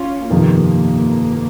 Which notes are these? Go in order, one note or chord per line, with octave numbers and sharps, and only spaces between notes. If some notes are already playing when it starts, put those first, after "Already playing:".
Already playing: C#4 F4
G1 F2 C3 D#3 A#3